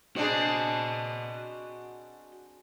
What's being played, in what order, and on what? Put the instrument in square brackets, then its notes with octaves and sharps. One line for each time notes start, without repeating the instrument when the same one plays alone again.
[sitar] C4 D4 G#4 [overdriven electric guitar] F#4 D#5